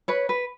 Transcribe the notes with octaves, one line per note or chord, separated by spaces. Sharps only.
B4 C#5
B4